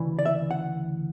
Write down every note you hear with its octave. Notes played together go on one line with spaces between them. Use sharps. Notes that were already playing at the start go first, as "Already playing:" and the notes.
Already playing: D2 C#3 E3
D5
E5
F#5